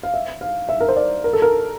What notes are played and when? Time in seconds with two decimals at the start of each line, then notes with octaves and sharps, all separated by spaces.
0.03 F5
0.14 E5
0.41 F5
0.69 E5
0.80 A#4
0.89 C5
0.97 D5
1.24 A#4
1.33 A4
1.42 A#4